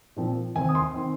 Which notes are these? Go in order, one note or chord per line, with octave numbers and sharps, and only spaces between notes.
A#2 F3 C4
D#2 D#3 C4 G#5
D#6
C6
D#3 C4